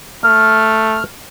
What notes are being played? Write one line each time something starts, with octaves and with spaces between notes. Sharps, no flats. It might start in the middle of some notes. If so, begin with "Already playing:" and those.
A3 F6